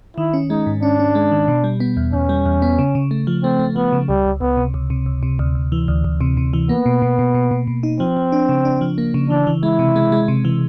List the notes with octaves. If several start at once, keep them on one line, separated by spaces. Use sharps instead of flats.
D#3 E4
C#4
G#3 D#4
G#2
C#4 D4
C#4
G#3
D#3
B2
G3
B3
E2
E2 C#4
G3
E2
B3
C#3
C#3
A3
F3
A3 C4
A3
F3 B3
C#3
C#2 G3
C#2
C#2 B3
C3
C#2
C3
C#2
C3
D2
D2
E3
D2
D2
C3
C3
E3
A#3 B3
B2
B2
B2
B2
B2
B2
D#4
F3 C4
F3
D4
C#3
D4
F3
A#3
C#3
E3 D4
E3
G#3 E4
C3
G#3
G#3
C3
E3